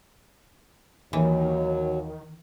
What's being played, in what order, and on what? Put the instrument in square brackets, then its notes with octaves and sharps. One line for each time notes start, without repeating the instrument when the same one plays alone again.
[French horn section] D#2 [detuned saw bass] D#3 [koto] E3 [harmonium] F#3